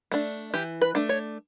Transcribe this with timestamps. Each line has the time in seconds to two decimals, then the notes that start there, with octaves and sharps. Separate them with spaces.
0.12 A3 D4
0.54 E3 G4
0.82 B4
0.95 A3 D4
1.09 C#5